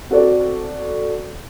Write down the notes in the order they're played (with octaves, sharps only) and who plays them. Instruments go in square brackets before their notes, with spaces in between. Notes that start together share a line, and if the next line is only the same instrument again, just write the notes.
[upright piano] C4 F#4 A4 D5